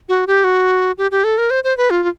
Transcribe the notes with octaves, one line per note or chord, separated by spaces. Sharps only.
F#4
G4
F#4
G4
G4
A4
A#4
C5
C5
B4
F4
F4